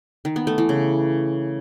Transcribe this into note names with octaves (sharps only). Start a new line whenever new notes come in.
D#3
B3
A3
E3
C#3